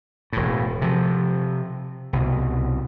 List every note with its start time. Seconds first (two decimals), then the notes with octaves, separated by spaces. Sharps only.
0.33 E1 A2
0.82 C3 F3
2.13 C2 B2